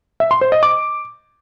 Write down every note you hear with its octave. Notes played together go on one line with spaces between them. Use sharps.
E5
C6
C5
D#5
D6